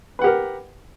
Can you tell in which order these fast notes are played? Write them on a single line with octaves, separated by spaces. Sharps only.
B4 F#5 G4 A#4